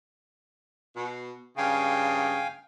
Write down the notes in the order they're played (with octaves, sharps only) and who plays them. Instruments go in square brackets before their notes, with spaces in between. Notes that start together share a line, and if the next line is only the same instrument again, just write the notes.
[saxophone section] B2
[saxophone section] G2 C#3 [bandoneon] F5 G5 G#5